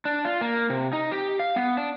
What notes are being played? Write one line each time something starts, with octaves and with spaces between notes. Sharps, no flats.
D4
F4
A#3
C3
D#4
G4
F5
B3
D4